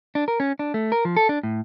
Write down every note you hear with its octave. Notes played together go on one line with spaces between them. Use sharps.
D4
A#4
C#4
D4
A3
A#4
F3
A4
D4
A2